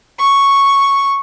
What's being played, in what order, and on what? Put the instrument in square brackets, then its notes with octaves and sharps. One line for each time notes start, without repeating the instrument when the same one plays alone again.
[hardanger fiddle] C#6